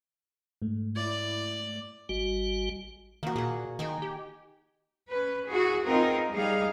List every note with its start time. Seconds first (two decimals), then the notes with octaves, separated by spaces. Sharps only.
0.62 G#2 A3
0.97 E4 D5
2.09 G#1 G3 F#4
3.23 D#3 A#3 F#4
3.36 A#2 G#4 F#5
3.79 D#3 D#4 G5 G#5
4.02 G4
5.09 C#4 B4
5.49 E4 F#4 G#4
5.85 B3 C4 D#4 F4 G#4 A#4
6.31 G3 D#4 G#4 F5